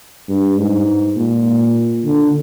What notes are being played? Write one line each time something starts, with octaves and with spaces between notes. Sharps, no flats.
G2
G#2
A#2
D3